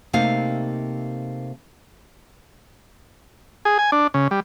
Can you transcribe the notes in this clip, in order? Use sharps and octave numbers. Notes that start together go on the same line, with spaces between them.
C3 A3 A#3 D#4 F5
G#4
G#5
D4
C#3
G3